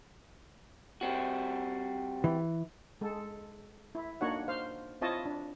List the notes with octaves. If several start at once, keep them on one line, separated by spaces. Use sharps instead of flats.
G3 C4 F#4
E3
G#3 A4
E4
A#3 D4 D#4 F#4 C#5 F#5
C5 F5
C4 E4 F4 C#5 D#5 A5
D4